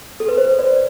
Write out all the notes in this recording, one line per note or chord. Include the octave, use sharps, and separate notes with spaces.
A4
B4
C5
D5